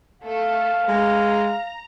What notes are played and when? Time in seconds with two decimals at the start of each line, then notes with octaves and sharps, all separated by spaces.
0.22 A3 A4 F5
0.88 G#3 A#5